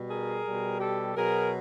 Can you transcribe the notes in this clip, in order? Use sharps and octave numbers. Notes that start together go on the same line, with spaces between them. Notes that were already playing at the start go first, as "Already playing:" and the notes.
Already playing: B2 G3
G#4 A#4
B2 G3
G4 A4
B2 F#3 G#4 A#4